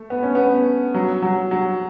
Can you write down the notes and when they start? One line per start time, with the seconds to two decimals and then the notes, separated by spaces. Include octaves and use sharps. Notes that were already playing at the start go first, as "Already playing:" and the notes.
Already playing: A3
0.10 B3
0.23 C#4
0.35 B3
0.94 F#3
1.22 F#3
1.51 F#3